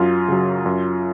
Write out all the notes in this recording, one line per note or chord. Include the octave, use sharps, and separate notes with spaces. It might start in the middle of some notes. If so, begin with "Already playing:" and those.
Already playing: F#2 F4
C#3 F#3
F#2